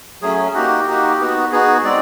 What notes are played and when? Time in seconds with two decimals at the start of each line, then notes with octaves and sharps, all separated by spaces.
0.22 F#3 A3 C#4 G#4
0.54 A#3 D#4 F#4 G4
0.87 A#3 D#4 F#4
1.20 B3 D#4 F#4
1.51 B3 D#4 F#4 G#4
1.84 G#3 C4 D#4 D5